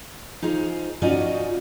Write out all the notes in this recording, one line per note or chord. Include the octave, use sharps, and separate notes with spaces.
D#4 F4 G#4 C5
C#4 D#4 F4 F#4 D5 D#5